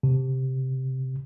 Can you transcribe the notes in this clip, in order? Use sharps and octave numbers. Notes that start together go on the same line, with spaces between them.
C3